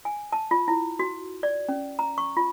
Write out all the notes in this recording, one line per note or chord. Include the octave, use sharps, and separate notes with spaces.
G#5
A5
F4
E4
F#4
D5
C#4
A#5
C#6
F4